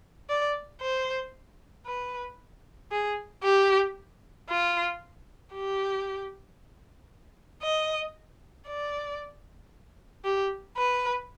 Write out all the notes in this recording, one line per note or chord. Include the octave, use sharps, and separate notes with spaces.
D5
C5
B4
G#4
G4
F4
G4
D#5
D5
G4
B4